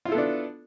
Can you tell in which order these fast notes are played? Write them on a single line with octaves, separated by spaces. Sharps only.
F4 E4 A4 B3 D4